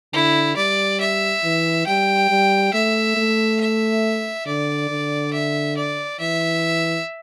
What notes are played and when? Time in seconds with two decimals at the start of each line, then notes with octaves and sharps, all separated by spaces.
0.14 D3 E4
0.57 G3 D5
1.00 E5
1.44 E3
1.87 G3 G5
2.30 G3
2.74 A3 E5
3.17 A3
3.61 E5
4.46 D3 D5
4.90 D3
5.33 E5
5.77 D5
6.20 E3 E5